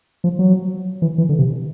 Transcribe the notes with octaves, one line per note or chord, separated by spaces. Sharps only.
F3
F#3
E3
E3
D3
C3